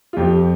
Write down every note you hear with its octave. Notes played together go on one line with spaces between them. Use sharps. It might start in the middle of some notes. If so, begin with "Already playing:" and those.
F4
F2 G4